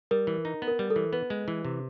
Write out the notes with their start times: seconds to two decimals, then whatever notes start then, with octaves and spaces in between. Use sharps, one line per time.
0.11 G3 A#4
0.27 E3
0.45 D#4
0.62 B3
0.68 A#4
0.79 G3
0.90 A4
0.96 E3
1.13 B3 B4
1.30 G#3
1.48 E3
1.65 C3